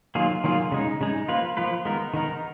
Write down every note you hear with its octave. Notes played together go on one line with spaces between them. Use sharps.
D#3 F#3 A#3 F4 G#4
D#3 F#3 A#3 F4 G#4
C#3 G#3 D#4
C#3 G#3 D#4
F3 A#3 F4 B4
F3 A#3 F4 B4
D#3 G#3 B3 D#4 A#4
D#3 G#3 B3 D#4 A#4